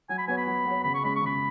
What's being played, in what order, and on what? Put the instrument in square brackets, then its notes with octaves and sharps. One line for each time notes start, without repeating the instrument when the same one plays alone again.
[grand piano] F#3 [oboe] G#5
[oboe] B5
[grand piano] B3 F#4 C#5 [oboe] G#5
[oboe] B5
[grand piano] F#3
B3 F#4 C#5
[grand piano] C#3 [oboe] B5
[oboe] C#6
[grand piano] G#3 C#4 [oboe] B5
[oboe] C#6
[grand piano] C#3 [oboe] B5